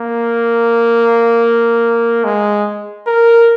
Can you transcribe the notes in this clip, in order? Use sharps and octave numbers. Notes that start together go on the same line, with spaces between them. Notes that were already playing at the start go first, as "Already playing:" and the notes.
Already playing: A#3
G#3
A#4